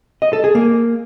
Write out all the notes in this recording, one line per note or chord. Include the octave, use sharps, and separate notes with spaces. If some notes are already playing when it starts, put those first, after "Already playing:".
D#5
A4
G#4
A#3